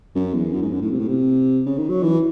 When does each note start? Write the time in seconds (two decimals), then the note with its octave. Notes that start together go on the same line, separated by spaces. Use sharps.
0.15 F#2
0.34 E2
0.53 F#2
0.62 G#2
0.72 F#2
0.82 A2
0.91 C3
0.99 A2
1.08 C3
1.66 C#3
1.78 D#3
1.90 F#3
2.03 E3